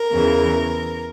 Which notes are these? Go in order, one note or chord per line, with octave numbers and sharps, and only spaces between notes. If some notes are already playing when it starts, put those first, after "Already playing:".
Already playing: A#4
E2 C#3 E3